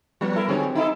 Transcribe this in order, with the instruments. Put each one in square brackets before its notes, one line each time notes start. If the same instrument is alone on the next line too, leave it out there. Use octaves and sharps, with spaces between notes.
[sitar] F3 [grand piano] G3 B3
[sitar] E4 A4 A#4
[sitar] D3 G#4 C#5 [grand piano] F#3 C4 G4
[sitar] D#4 E4 A4